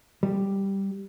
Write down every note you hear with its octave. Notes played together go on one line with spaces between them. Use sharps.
G3